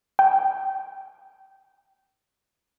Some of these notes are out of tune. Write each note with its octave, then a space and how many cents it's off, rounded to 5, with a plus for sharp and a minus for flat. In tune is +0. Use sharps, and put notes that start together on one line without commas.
G5 -20